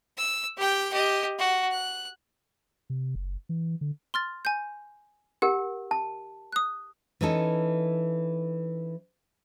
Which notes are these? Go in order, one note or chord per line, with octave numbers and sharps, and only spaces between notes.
E6
G4 G5
G4 D#5
F#4
F#6
C3
F#1
E3
D3
C6 F6 A6
G#5 G6
G4 A#4 F#5
A5
D#6 F#6
E3 C#4 D#4 A4